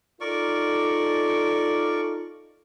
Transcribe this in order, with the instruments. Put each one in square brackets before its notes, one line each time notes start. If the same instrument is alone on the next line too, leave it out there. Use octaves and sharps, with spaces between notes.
[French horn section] D#4 F4 A4 [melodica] A#4 D5 C#6